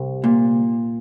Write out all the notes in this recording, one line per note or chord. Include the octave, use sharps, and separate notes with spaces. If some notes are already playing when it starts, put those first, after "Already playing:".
Already playing: C2
A#2